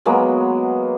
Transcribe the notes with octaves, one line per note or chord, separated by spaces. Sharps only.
F#3 G#3 A#3 B3